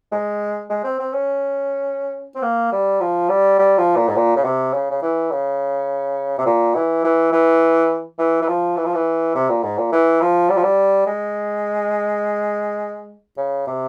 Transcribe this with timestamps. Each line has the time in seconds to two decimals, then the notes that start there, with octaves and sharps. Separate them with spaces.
0.12 G#3
0.70 G#3
0.84 C4
0.99 C4
1.13 C#4
2.35 C4
2.42 A#3
2.72 G3
3.00 F3
3.29 G3
3.59 G3
3.78 F3
3.96 A#2
4.08 G#2
4.16 A#2
4.36 C#3
4.44 C3
4.74 C#3
4.91 C#3
5.02 E3
5.32 C#3
6.39 C3
6.46 A#2
6.75 E3
7.04 E3
7.32 E3
8.19 E3
8.42 E3
8.48 F3
8.77 E3
8.85 F3
8.94 E3
9.35 C3
9.49 A#2
9.63 G#2
9.78 A#2
9.92 E3
10.21 F3
10.50 G3
10.57 F3
10.63 G3
11.06 G#3
13.37 C#3
13.67 C3